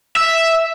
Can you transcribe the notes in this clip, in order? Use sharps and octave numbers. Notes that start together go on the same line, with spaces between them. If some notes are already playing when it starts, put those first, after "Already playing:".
E5